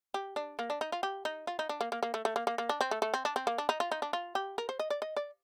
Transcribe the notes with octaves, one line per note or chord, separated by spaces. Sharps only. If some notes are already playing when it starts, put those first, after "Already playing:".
G4
D4
A#3
D4
D#4
F4
G4
D#4
F4
D#4
D4
A#3
A#3
A#3
A3
A3
A#3
A#3
A#3
D4
C4
A3
A3
C4
D4
C4
A#3
D4
D#4
F4
D#4
D4
F4
G4
A#4
C5
D#5
D5
D#5
D5